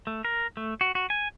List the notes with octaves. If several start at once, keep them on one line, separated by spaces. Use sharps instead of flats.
A3
A#4
A3
F#4
F#4
G#5